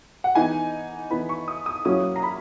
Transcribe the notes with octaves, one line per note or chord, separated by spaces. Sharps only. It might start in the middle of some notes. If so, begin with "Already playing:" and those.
F#5
E3 B3 D#4 G#5
E3 B3 D#4 B5
C#6
D#6
D#6
F#3 A#3 C#4 E4 D#6
A#5
B5